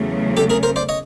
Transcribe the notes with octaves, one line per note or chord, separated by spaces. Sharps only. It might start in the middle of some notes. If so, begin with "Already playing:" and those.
Already playing: E2 C#3 F#3 A3
G4 A4
G#4 A#4
A#4 C5
C5 D5
C#5 D#5